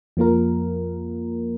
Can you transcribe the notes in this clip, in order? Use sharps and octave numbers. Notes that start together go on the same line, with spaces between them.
F2 F3 A#3 F4 A#4